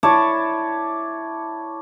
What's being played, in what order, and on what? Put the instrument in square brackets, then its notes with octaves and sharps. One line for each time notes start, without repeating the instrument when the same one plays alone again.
[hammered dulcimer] E4 C#5 D5 A5